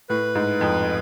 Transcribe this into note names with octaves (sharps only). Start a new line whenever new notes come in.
A2 B4
G#2
F2